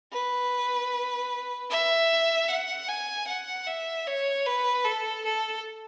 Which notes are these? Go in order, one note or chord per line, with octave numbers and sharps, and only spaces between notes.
B4
E5
F#5
G#5
F#5
E5
C#5
B4
A4
A4